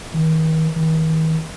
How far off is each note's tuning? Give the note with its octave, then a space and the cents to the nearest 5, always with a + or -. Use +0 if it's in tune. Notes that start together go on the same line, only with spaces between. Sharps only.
D#3 +40
D#3 +45